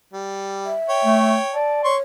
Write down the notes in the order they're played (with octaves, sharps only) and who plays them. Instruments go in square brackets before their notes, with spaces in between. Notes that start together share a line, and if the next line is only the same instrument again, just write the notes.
[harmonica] G3
[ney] E5
[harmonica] C#5 G5
[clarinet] A3
[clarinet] D5 [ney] A5
[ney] C#5 [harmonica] C6 C#6